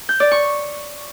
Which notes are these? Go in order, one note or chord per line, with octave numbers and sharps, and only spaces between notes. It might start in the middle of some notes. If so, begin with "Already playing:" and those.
G6
D5
C#6